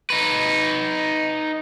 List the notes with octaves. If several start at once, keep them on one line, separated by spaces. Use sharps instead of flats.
D#4 B4